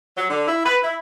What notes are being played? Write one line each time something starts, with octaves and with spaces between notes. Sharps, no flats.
F#3
D3
E4
B4
E4